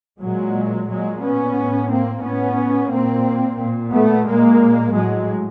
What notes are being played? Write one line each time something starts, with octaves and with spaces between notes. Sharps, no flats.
A#2 F#3 G#3
A#2 F#3 G#3
B3 C#4
A2
A#3 C4
A2 B3 C#4
A#2 A#3 C4
A#2
A3 B3
A#2 G#3 A#3
A2 F#3 G#3